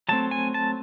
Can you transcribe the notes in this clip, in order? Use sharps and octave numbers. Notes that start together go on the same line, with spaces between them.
F#3 A3 C4 A5
G#5
A5